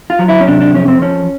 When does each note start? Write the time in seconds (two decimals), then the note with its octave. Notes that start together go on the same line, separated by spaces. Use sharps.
0.10 F4
0.19 F#3
0.28 E4
0.41 C#4
0.47 C3 D4
0.61 D4
0.74 F2 C#4
0.88 C4
1.02 F3 C#4